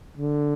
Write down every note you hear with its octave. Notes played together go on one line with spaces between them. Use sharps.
D3